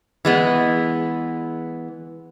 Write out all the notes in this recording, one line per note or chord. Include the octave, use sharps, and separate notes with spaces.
E3 G#3 B3